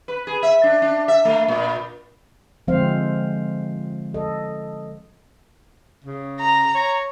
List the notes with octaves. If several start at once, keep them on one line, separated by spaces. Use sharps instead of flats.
B4
G#4
E5
D4
D4
E5
A3
A#2
D3 F3 G#3 C4 C5 F5
A4 D#5
C#3
A#5
C#5